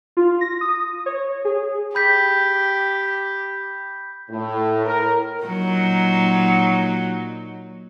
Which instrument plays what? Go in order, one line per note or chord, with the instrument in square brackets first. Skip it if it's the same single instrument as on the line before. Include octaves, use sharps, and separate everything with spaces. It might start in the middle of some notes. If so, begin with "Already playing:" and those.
[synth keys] F4
A#6
D#6
C#5
G#4
[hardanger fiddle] G4 [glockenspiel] B5 G6 B6
[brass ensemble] A2
A#4
[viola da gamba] A#2 F#3 D#4